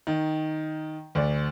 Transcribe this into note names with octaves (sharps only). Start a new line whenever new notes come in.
D#3
D2 D5